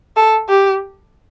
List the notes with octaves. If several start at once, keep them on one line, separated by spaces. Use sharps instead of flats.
A4
G4